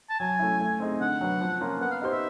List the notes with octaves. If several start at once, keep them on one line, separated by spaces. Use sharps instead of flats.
A5
F#3 G#5
A3 C#4 E4
A3
C4 D#4 G#4
D3 F#5
F#3 B3
F3
A#3 C#4 F4 A#4
B3 F#5
F5
D#4 G4 C5
E5